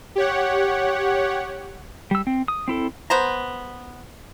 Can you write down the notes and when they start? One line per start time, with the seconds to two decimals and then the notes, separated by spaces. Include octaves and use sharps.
0.15 G4 C#5 F#5
2.11 G3 E6
2.27 C4
2.48 D#6
2.68 C4 E4 A4
3.10 B3 C5 A#5